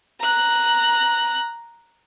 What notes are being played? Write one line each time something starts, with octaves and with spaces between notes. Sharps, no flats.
A#5 F#6